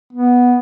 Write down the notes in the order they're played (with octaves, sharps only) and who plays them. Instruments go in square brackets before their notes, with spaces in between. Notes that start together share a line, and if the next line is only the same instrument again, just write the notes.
[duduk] B3